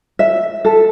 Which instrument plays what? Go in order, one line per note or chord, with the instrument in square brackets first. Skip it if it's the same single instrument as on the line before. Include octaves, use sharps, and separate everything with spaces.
[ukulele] E5
A4